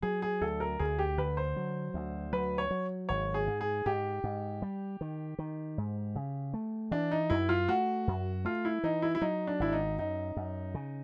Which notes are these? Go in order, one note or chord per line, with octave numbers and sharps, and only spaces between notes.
F#3 G#4
G#4
D2 A4
A#4
D2 G#4
G4
D3 B4
C5
F#3
D2
F#3 B4
C#5
F#3
G#1 C#5
G#4
G#2
G#4
G#2 G4
G#2
G3
D#3
D#3
G#2
C#3
A3
E3 D4
D#4
F#2 E4
F4
A3 F#4
F#2
A3 F4
E4
E3 D#4
E4
E4
F#3 D#4
D4
G#1 E4
D#4
F#2 D#4
F#2
C#3